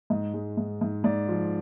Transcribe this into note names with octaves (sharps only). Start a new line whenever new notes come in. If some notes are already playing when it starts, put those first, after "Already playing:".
G#2 D#5
G#3
G#2
G#2
G#2 D5
F3